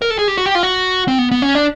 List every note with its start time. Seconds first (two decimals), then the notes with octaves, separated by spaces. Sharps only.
0.02 A#4
0.11 A4
0.19 G#4
0.28 G4
0.37 F#4
0.46 G4
0.55 F4
0.63 F#4
1.08 C4
1.19 B3
1.31 B3
1.42 C#4
1.55 D4